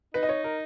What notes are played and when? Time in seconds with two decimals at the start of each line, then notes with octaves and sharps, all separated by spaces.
0.14 D#4 B4
0.23 D#5
0.29 C#5
0.44 A#4